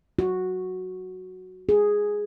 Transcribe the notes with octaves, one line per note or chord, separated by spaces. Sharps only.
F#4
G#4